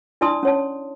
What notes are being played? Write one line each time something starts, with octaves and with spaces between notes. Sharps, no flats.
D4 E4 D5 A5 C6 D#6
C#4 C#5 A5